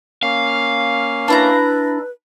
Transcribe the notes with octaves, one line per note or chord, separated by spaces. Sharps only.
A#3 C#4 F5
D4 E4 B4 A#5